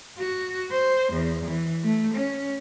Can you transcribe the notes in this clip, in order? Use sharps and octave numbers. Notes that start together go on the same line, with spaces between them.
F#4
C5
E2
E3
A3
C#4